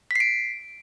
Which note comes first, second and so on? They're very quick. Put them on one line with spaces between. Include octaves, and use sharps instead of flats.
B6 C7 D7